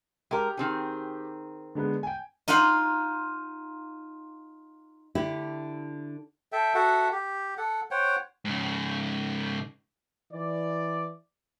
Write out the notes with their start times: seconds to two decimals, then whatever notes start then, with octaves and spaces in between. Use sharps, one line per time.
0.31 G#3 G4 A#4
0.57 D#3 C4 G#4
1.75 D3 G#3 B3
2.03 G5 G#5
2.48 D#4 F4 F#5 C6
5.15 D3 E4 G4
6.52 A4 E5 G5
6.75 F#4 A4 E5 F#5
7.12 G4
7.58 A4 F#5
7.91 C5 C#5 F#5 G5
8.45 G#2 C#3
10.32 E3 D5